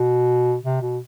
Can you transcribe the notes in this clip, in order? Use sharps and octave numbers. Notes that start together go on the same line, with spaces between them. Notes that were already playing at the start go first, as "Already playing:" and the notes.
Already playing: B2
C3
B2